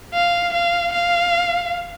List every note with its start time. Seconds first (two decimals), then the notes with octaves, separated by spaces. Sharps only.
0.14 F5
0.54 F5
0.93 F5